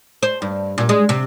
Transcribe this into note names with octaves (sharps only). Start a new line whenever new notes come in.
C5
G2
A#2
G#3
C3